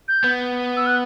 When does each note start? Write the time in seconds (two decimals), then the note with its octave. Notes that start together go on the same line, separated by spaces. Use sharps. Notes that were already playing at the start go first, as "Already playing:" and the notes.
0.08 G6
0.24 B3
0.77 E6
0.87 F#6